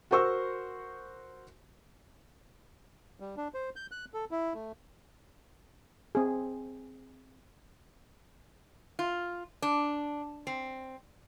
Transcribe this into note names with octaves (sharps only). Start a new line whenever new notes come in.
F#4 A#4 C5 C#6 E6
G3
D4
C5
G6
F#6
A4
E4
A3
C4 G#4
F4
D4
C4